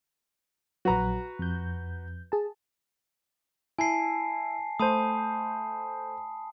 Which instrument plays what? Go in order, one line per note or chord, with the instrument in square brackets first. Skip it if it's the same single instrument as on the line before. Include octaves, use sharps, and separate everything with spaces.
[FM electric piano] A#1 F#3 [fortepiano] F#4 B4 A#5
[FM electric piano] F2 G6
G#4 A5
[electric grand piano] E4 [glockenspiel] G#5 A5 C7
[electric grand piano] A3 C5 [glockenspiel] A5 B5 D#6